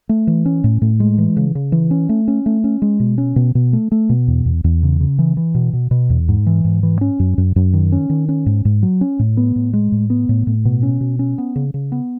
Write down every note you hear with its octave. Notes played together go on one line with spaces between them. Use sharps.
A3
E3
C#4
A2
A2
G#3
E3
C#3
C#3
E3
C#4
A3
C#4
A3
C#4
G#3
B2
C#4
B2
B2
A3
A3
B2
E2
E2
E2
C#3
C#3
E3
E3
B2
B2
B2
E2
G#2
E3
G#2
E3
C#4
F#2
F#2
F#2
D#3
C#4
D#3
C#4
G#2
G#2
F#3
C#4
A2
B3
A2
G#3
A2
B3
A2
A2
B2
C#4
B2
C#4
B3
C#3
C#3
B3